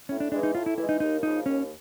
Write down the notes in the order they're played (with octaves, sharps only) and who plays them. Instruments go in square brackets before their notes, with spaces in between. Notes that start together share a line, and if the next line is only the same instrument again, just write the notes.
[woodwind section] A2 [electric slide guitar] C#4
[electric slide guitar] D4
[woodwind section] E3 G#3 [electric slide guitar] D4
[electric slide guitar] D#4
[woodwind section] A2 [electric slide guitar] F4
[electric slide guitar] E4
[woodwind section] E3 [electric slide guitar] E4
[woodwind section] G#3
[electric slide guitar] D#4
[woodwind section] D#2 [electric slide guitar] D#4
[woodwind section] C#3 F3 A#3 [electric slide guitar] D#4
[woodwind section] D#2 [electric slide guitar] C#4